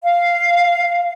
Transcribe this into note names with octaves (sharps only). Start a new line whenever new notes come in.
F5